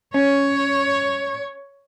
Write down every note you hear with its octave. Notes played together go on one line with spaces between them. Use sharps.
C#4 C#5